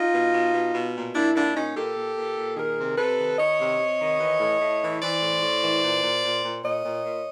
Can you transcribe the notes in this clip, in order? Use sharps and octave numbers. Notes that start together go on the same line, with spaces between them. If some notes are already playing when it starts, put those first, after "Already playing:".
Already playing: D#4 F4
B2
B2
B2
B2
A#2
A#2 D4 E4
A#2 D4 E4
A#2 C#4 D#4
A#2 G4 A4
A#2
A#2
A#2
D#3 G#4 A#4
C3
C3 A4 B4
D#3
D#3 C#5 D#5
C3
C3
D#3
E3
A2
A2
E3
E3 C5 D5
A2
A2
E3
A#2
A#2
A#2
A#2
A#2 C#5 D#5
A#2
A#2